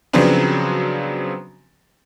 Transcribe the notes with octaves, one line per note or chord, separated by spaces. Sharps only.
C#3 F3 F#3 B3 C4 D4